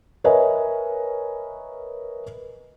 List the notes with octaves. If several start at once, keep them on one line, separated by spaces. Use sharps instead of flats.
A#4 B4 C#5 D#5 E5 G#5